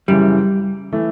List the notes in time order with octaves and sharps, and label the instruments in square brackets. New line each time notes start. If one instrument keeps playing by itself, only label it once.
[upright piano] F#2 C#3 E3 [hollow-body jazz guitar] G3
[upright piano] E3 A3